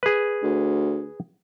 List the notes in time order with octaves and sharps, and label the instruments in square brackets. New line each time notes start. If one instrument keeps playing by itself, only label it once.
[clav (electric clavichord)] G#4 B4
[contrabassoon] D2